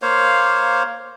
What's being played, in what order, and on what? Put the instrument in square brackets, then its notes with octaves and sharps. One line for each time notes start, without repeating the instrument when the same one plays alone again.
[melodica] A#3 C5 C#5 F5